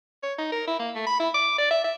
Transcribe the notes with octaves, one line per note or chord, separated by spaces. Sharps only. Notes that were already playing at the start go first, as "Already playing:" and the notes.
C#5
D#4
A#4
E4
A#3
A3
B5
E4
D6
D5
E5
E5